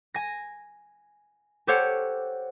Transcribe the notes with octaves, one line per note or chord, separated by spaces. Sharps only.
G#5 A#6
G4 A4 C5 C#5 F#5